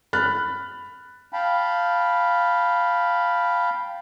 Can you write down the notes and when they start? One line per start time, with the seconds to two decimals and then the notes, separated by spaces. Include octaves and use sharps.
0.13 B5 F6 F#6 A6
1.32 F5 G5 A5 B5